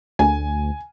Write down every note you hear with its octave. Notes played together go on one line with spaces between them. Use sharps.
D2 G#5